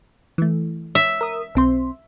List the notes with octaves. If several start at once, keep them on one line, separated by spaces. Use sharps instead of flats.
E3 A3
E5
A#4 D#6
B1 C4 C6